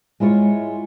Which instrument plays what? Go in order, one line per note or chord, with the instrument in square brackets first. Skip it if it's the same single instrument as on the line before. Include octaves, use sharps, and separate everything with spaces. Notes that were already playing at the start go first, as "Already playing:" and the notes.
[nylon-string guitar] G#3 E4 F4 C#5